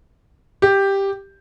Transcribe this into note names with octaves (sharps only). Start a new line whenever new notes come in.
G4